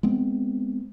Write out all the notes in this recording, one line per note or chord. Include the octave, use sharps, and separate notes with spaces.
G#3 B3 C4